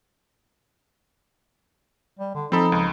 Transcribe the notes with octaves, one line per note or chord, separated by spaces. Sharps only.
G3
D3
F3 C4 D#4 A4 B5
C#2